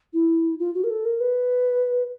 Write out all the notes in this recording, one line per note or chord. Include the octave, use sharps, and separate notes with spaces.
E4
F4
F#4
A#4
A4
A#4
B4